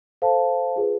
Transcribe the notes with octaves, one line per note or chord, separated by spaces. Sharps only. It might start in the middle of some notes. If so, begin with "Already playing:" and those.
A4 C5 F5 A5
F4 G#4 B4